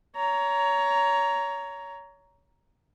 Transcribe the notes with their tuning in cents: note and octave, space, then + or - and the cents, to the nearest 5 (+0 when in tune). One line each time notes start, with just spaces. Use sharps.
C#5 +25 A#5 +0